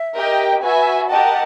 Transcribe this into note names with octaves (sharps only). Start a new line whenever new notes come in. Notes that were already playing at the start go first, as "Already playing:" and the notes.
Already playing: E5
G4 A#4 D#5 G5
F#4 B4 E5 G#5
G4 A#4 D#5 F#5 G5 A5